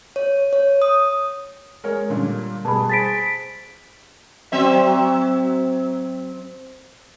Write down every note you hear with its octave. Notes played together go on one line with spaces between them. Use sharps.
C#5
C#5
D#6
G#3 A#4 C#5
A#2 D3 G3
B2 G3 G#4 A5 B5
G#4 C5 A6 B6 D7
F#3 C4 E5